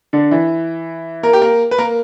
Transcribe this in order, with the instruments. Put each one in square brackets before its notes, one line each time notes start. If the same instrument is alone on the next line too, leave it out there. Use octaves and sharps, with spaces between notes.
[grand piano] D3 D4
E3 E4
A#3 A#4
G4
A#3 A#4
B4
A#3 A#4